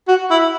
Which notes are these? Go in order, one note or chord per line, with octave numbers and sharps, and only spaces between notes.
F#4
E4